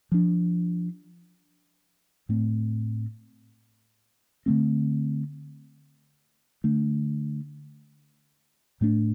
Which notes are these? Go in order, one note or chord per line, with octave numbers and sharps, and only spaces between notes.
F3 D4
A2 A3 C4
D3 A3 C4
D3 A3 D4
A2 A3 D4